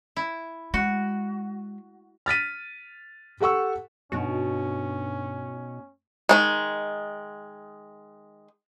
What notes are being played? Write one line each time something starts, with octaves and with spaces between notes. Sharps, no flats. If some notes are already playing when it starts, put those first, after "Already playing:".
E4
G#3 F#4
F6 A6 B6 D#7
G4 A4 F#5 C#6 E6
G2 B2 C#4 D#4 F#4
D#3 E3 G#3